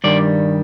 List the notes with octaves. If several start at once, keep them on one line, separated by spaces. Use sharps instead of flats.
G2 D#3 G3 D5